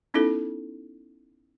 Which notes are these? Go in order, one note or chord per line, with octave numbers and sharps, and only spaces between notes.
B3 C#4 D#4 E4 A4